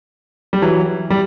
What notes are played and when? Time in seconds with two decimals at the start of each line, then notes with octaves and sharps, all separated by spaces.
0.53 G3
0.62 E3 F#3
1.10 G3